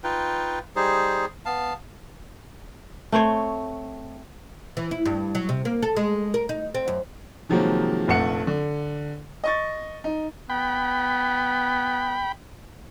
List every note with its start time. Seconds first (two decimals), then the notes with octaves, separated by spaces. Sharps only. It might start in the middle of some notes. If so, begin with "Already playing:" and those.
0.04 D#4 F4 B4 G5
0.76 G3 D#4 G#4 C5
1.46 B3 F5 A5
3.12 A3 C4 C5 C#5
4.77 E3
4.91 E4
5.06 G2
5.35 F#3
5.49 C3
5.65 A#3
5.82 A4
5.96 G#3
6.34 A#4
6.49 D#4
6.74 C4
6.88 F#2
7.49 C3 D#3 F3 F#3 G#3 A#3
8.08 F1 A#1 A3 F#5 C#7
8.47 D3
9.44 D#5 C#6 A6
10.04 D#4
10.50 B3 G5 B5